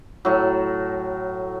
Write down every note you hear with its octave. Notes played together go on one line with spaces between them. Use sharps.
A2 F#3